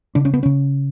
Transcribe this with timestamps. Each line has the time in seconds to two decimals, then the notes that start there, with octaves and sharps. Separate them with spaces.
0.15 C#3 D4
0.25 C#4
0.34 B3
0.43 C#3 C#4